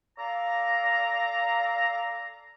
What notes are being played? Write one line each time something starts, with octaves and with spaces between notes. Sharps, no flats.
A4 D5 F5 A#5